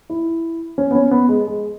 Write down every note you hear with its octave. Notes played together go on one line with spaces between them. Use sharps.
E4
C#4
B3
C#4
B3
G#3
G#3